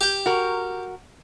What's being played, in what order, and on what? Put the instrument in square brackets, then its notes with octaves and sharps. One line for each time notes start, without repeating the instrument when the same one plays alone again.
[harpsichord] G4 G5
[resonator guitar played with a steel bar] F#4 A#4